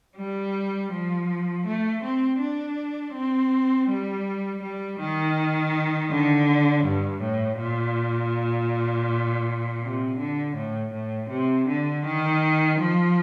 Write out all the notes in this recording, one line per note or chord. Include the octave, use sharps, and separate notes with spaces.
G3
F3
A3
C4
D4
C4
G3
G3
D#3
D3
G2
A2
A#2
C3
D3
A2
A2
C3
D3
D#3
F3